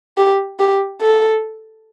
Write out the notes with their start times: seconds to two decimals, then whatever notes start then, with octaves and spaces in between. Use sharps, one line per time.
0.17 G4
0.59 G4
1.01 A4